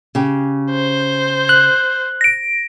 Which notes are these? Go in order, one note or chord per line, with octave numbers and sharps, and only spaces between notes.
C#3 G4
C5
F#6
A#6 D7